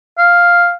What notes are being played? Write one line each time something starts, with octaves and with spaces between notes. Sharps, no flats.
F5